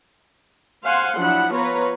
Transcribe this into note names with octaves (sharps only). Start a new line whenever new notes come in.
C5 F5 F#5 G#5 C6
F3 F#3 D4 E4 F#5 B5
B3 F4 B4 C#5 A#5